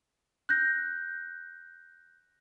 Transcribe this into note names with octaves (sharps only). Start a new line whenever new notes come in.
F#6 G6 A#6